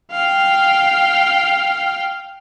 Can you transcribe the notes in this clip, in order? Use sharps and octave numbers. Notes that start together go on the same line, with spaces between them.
F5 G5